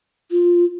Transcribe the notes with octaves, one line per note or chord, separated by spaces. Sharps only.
F4